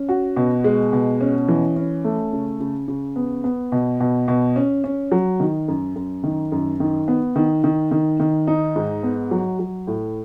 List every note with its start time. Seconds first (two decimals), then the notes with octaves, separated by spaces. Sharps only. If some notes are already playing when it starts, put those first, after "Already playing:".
Already playing: C#4
0.09 F#4
0.36 B2
0.64 G#3
0.93 B2
1.21 C#4
1.48 E3
1.76 C#4
2.04 A3
2.33 C#3
2.60 C#3
2.88 C#3
3.16 B3
3.44 B3
3.72 B2
4.00 B2
4.28 B2
4.56 C#4
4.84 C#4
5.12 F#3
5.40 D#3
5.68 F#2
5.96 F#2
6.24 D#3
6.52 F#2
6.80 D#3
7.08 B3
7.36 D#3
7.64 D#3
7.91 D#3
8.20 D#3
8.47 D#4
8.76 G#2
9.03 B3
9.31 F#3
9.59 F#3
9.87 A2